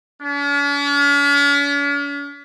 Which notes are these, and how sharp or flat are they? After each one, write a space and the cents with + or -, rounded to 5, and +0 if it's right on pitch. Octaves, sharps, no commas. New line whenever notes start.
C#4 +45